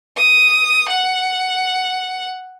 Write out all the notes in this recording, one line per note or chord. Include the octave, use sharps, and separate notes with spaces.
D#6
F#5